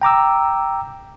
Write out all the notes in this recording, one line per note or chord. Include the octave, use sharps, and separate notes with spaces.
G5 A#5 D6 E6